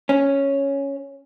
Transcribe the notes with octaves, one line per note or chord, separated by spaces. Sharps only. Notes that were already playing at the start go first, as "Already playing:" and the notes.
C#4